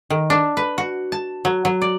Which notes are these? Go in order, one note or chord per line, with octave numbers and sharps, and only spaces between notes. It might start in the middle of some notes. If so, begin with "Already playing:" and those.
D#3
D4
B4
F#4
A5
F#3
F#3
D5